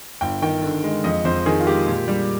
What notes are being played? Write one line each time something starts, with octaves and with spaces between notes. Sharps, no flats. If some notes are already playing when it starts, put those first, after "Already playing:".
G1 G5
D#3 G5
D3
G#3
F2 D#5
F2 C5
D#3 G#4
F4
G#3 G4
A#2
G3